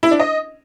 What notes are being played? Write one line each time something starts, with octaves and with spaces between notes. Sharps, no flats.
E4
D4
D#5